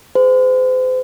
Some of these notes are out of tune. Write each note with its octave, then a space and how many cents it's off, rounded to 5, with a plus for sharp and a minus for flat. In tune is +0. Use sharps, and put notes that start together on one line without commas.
G#4 +0 C5 -40